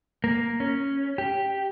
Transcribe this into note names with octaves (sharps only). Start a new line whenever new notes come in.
A#3
C#4
G4